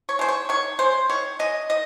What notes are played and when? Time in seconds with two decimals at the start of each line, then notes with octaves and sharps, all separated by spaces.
0.09 C#5
0.19 G#3 C5
0.29 C#5
0.49 D#3 C#5
0.79 G#3 C5
1.10 D#3 C#5
1.39 G#3 D#5
1.70 D#3 D#5